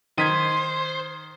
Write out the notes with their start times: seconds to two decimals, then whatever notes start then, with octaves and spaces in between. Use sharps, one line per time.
0.18 D#3 C5 C6 G#6 B6 D#7